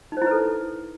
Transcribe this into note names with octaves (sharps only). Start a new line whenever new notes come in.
D#4 E4 A4 B4 C5